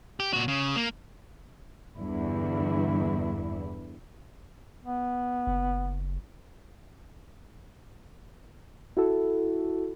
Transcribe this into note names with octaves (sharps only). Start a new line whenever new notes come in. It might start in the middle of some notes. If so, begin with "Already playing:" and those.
G4
A#2 F#4
C#3
A#3
E2 G2 D3 E4
B3
F#1
E4 F#4 A4